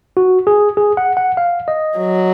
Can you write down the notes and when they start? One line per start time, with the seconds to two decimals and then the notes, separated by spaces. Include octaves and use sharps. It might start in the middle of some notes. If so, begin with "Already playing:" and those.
0.17 F#4
0.47 G#4
0.77 G#4
0.97 F#5
1.17 F#5
1.37 F5
1.68 D#5
1.98 F#3